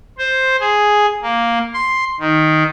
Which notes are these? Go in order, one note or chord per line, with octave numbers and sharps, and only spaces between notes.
C5
G#4
A#3
C6
D#3